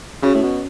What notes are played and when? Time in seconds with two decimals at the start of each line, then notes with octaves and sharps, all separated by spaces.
0.22 C#3 C#4 F#4 C#5
0.34 A2
0.43 B2